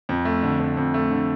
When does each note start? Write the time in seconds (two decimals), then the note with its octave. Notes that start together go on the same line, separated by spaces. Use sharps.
0.09 F2
0.25 A3
0.43 D3
0.59 F2
0.77 F2
0.94 A3
1.11 D3